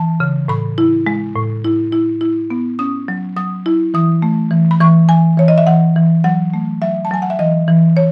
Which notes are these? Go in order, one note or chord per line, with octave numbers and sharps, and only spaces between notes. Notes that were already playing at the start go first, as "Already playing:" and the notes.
Already playing: E3 A5
C#3
A2 B5
E4
G#3
A2
E4
E4
E4
B3
C#4 D#6
F#3
F#3 D#6
E4
E3 D#6
A3
E3
B5
E3 C#6
E3 G#5
E3 C#5
D#5
E5
E3 F#5
E3
F#3 F#5
A3
F#3 E5
A5
F#3 G#5
F#5
E5
E3 D#5
E3
C#5